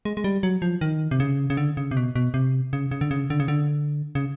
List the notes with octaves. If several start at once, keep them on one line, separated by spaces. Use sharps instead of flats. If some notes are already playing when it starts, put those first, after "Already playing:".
G#3
G#3
G3
F#3
F3
D#3
C3
C#3
C#3
D3
C#3
C3
B2
B2
C3
C#3
C#3
D3
C#3
D3
C#3
D3
C#3